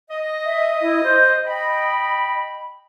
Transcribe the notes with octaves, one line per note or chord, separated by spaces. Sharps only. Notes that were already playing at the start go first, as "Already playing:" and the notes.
D#5
E5
E4
C5
D#5 G5 B5